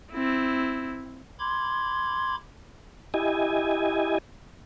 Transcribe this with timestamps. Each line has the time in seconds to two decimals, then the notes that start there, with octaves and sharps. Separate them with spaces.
0.12 C4 E4
1.39 B5 C6 D6 G#6
3.14 E4 G4 D#5 G#5